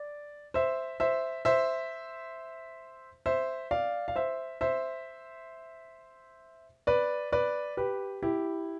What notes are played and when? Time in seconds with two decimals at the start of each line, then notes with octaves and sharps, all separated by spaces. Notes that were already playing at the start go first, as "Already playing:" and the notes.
Already playing: D5
0.54 C5 E5
1.00 C5 E5
1.45 C5 E5
3.26 C5 E5
3.71 D5 F5
4.08 F5
4.16 C5 E5
4.61 C5 E5
6.87 B4 D5
7.32 B4 D5
7.77 G4 B4
8.23 E4 G4